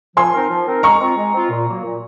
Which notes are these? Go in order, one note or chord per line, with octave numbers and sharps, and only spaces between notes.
F3 G#5 C6
C4 D#4 A#4
F3
C4 D#4 A#4
G#3 A#5 C#6
C4 F4
G#3
C4 F4
A#2
F#3 A#3
A#2